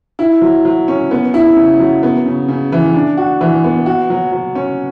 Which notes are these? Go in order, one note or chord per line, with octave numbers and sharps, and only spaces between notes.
E4
F#3
F#3
C#4
B3
E4
C#3
F#3
B3
C#3
C#3
E3
D4
F#4
E3
B3
F#4
F#3
F#3
C#4